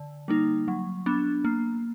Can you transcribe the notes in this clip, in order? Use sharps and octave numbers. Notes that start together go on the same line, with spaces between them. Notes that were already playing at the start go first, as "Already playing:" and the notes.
Already playing: D3
G3 A#3 D#4
F#3
B3 D4
A#3